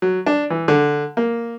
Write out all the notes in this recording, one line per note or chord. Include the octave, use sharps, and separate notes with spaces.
F#3
D4
E3
D3
A#3